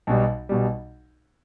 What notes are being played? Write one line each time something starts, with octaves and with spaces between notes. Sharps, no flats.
B1 B2 G3
B1 B2 G3